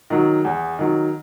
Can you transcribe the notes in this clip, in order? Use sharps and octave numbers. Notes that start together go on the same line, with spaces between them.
D#3 F#3
E2
D#3 F#3